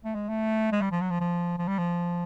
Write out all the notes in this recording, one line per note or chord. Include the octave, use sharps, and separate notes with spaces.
A3
G#3
A3
G#3
G3
F3
F#3
F3
F3
F3
G3
F3